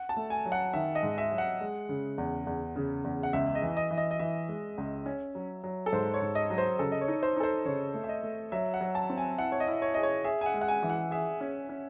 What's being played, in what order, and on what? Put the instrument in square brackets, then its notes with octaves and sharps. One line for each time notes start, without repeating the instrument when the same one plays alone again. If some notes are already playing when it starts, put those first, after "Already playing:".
Already playing: [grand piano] F#5
A5
[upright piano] A3
[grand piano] G#5
[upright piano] F#3
[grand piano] F#5
[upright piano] D#3 [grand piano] E5
[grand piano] D#5
[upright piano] G#2
[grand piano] E5
[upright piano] F#3
[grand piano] F#5
[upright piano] G#3
C#3
E2
E2
C#3
E2
[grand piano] F#5
[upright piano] C#2 [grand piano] E5
[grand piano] D#5
[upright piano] E3
[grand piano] D#5
[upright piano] E3
[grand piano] D#5
D#5
[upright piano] E3 [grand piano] E5
[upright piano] G#3
C#2
C#4
F#3
F#3
[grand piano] A4
[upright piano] G#2 [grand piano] C5
[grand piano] C#5
[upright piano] G#2
[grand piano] D#5
[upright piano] F#3
[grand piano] C5
[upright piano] C#3 [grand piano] A4
[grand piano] D#5
C#5
[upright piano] D#4
[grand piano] C5
[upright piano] D#4 [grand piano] A4
[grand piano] C5
[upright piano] C#3 [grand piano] C#5
[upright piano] A3
[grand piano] E5
D#5
[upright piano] A3
[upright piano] F#3 [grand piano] E5
[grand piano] F#5
[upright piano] F#3
[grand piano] A5
[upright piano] C4
[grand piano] G#5
[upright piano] E4 [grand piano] F#5
[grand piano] C#5
D#5
[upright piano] E4
[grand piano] C#5
[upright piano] G#4 [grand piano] D#5
[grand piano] C#5
[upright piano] G#4 [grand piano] E5
[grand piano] G#5
F#5
[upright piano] G#3
[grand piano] F#5
G#5
[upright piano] E3
[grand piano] F#5
[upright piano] G#4 [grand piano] E5
[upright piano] C#4
C#4